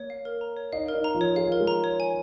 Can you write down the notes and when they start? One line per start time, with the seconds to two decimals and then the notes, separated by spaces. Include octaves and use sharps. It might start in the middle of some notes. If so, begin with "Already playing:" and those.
Already playing: A#3 C#5
0.10 F5
0.25 A#4
0.41 A#5
0.57 C#5
0.72 D#4 D#5 F5
0.88 A#4
0.94 D#4 D#5
1.04 A#5
1.15 F3 F4
1.21 C#5
1.36 G#4 F5
1.48 F4 A#4
1.60 G#3 G#4
1.67 A#5
1.84 C#5
2.00 G#5